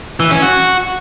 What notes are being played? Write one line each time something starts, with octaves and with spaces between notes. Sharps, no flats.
E3
C#4
F#4